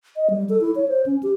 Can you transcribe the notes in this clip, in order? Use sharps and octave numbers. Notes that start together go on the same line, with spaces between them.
D#5
G3
A4
E4
C#5
C5
C#4
G4